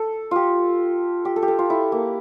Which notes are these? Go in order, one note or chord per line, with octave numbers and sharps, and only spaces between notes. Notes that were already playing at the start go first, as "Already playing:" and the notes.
Already playing: A4
F4 G4
G4
A4
G4
A4
F4
E4
A#3